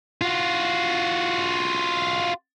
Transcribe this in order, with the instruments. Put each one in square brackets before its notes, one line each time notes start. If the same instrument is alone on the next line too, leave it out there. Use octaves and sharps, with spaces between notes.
[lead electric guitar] F4 F#4